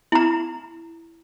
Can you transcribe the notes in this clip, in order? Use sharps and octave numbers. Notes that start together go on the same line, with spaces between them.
E4 A#5